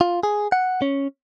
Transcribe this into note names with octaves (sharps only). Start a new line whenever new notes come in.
F4
G#4
F#5
C#4